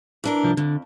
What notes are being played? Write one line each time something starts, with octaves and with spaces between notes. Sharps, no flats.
E3 D4 A#4
C2 F3
F2 D3